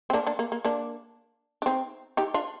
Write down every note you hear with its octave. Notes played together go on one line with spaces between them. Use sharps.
C4
A#3 D4
A#3 D4
A#3
A#3
A#3 D4
D4
C4 D#4
D#4 G4
D4 F4